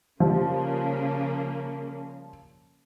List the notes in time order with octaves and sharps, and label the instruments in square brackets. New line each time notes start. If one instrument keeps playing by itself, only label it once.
[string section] C#3 A#3 [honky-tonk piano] F3 G3